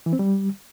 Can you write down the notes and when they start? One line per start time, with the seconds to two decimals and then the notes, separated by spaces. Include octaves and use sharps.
0.06 E3
0.13 C4
0.19 G3